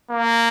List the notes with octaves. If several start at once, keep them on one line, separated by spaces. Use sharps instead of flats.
A#3